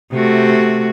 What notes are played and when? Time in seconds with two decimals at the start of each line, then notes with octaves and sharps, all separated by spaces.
0.13 C3 A3 F#4